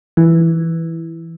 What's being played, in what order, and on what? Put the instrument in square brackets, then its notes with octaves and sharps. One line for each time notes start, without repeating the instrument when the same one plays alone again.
[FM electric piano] E3